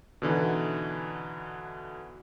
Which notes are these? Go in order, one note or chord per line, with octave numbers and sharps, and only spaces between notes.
B2 D3 E3 D#4